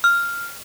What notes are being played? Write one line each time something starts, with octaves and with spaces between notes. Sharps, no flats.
F6